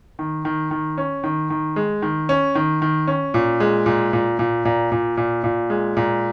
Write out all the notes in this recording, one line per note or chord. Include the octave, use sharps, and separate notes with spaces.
D#3
D#3
D#3
C#4
D#3
D#3
G#3
D#3
C#4
D#3
D#3
C#4
A#2
G#3
A#2
A#2
A#2
A#2
A#2
A#2
A#2
G#3
A#2